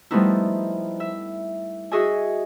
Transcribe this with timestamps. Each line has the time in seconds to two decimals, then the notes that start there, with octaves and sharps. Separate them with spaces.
0.11 F3 G3 A3 B3 D#4 E4
1.00 E5
1.91 F#4 G#4 D#5 E5 G#5